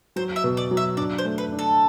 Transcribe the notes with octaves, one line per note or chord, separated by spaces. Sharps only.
F#3 C5
E5
B2
D5
F#3
E5
D4 D5
C5
A3
B4
D4
A4